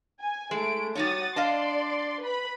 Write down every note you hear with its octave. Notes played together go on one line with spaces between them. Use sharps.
G#5
G#3 A3 E4 D7
G3 D#4 F#4 C#5 D#6 A6
D4 D5 D#5 F5 C6
B4 B5